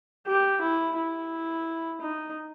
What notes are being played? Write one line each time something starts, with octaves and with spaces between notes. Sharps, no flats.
G4
E4
E4
D#4